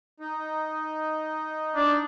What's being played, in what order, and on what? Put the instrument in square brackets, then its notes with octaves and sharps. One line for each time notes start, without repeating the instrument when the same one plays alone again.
[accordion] D#4
[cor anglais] D4